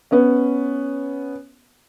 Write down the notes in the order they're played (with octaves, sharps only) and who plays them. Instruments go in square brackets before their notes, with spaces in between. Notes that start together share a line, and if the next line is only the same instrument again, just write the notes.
[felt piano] B3 C#4 C#5